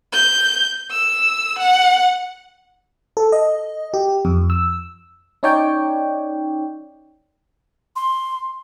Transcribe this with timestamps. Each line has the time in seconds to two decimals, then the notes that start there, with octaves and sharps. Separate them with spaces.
0.12 G6
0.90 E6
1.59 F#5
3.17 A4
3.32 D#5
3.94 G4
4.25 F2
4.50 E6
5.43 C#4 D#4 C#5 D5 G5
7.96 C6